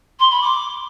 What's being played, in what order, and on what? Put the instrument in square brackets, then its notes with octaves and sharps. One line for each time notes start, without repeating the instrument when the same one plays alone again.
[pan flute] C6
B5
D6